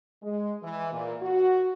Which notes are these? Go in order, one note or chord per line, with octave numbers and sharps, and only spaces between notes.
G#3
E3
A#2
F#4